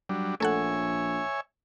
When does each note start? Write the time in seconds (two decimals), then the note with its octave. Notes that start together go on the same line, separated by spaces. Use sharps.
0.09 F#3 G3 D4
0.40 A#1 A3 A4 C#5 E5 F#5 G#5